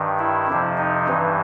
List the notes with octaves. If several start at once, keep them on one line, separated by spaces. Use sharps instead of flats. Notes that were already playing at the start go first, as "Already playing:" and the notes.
Already playing: G2 D#3
E4
F2 C3 F3
D#4
G2 E3